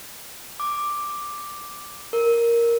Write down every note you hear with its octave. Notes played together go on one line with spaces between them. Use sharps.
D6
A#4